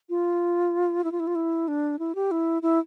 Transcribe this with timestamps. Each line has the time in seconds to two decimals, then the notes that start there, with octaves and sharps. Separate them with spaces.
0.10 F4
1.04 E4
1.12 F4
1.20 E4
1.27 F4
1.35 E4
1.68 D4
1.99 E4
2.15 G4
2.31 E4
2.62 E4